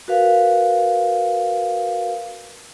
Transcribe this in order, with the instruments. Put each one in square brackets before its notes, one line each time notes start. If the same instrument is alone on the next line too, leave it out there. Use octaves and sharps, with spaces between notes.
[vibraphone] F#4 A#4 B4 F5